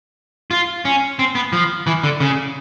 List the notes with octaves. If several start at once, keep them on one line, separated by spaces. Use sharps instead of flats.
F4
C#4
C4
B3
F3
E3
D3
C#3